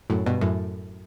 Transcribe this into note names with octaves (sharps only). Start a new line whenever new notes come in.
F#2 A2
G2 B2
F#2 A2